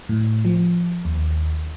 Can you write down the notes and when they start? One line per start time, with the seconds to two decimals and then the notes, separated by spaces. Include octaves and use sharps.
0.09 A2
0.45 F3
1.05 D#2